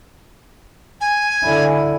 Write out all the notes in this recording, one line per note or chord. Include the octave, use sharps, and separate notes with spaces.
G#5
D3 E4